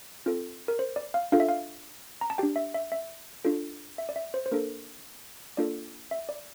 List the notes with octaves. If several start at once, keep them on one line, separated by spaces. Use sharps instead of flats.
C4 F4 A4
A#4
C5
D5
F5
D4 F4 A4 F5
E5
F5
A#5
A5
D4 G4 G5
E5
E5
E5
D4 F4 A4
E5
D5
E5
C5
C5
A#3 D4 A4 A#4
A#3 D4 F4 A4 D5
E5
D5